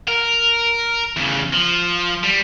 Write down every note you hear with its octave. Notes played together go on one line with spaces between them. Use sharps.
A#4
E2 C#3
F3
G3